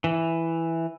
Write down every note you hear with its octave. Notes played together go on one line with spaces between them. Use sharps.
E3